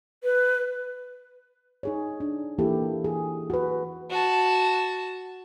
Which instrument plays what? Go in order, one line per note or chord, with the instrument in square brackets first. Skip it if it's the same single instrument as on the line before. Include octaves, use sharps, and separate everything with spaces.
[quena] B4
[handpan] D#4 G#4 C#5
D4
E3 A#3 E4 G4 A4
G#4
F#4 B4
[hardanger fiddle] F#4 A5